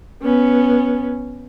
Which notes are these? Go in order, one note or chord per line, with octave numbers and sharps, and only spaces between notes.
B3 C#4